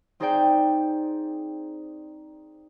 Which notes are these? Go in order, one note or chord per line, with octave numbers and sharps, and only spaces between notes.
C4 D#4 G#4 C5 D5 G5